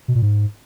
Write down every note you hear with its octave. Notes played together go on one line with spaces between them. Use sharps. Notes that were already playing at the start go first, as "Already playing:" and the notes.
B2
A#2
G#2